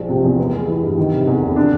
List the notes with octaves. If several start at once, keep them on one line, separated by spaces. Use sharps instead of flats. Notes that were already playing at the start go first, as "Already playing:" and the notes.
Already playing: A#1 F3 G#3
C3
E2
B3
G#3
E3
G2
D#3
C3
E2
F1
D4